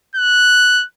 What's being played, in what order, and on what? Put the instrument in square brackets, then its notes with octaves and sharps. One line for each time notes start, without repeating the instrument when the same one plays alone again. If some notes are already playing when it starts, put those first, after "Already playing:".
[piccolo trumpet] F#6